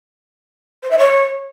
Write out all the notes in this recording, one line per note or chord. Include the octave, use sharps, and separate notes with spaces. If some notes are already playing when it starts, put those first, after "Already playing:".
C5
E5
C#5